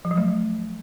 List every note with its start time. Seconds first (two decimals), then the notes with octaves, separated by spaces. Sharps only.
0.05 F3
0.11 F#3
0.17 A3